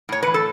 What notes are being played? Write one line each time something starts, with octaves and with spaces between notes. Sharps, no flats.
A2 C#5
E3 B4
A4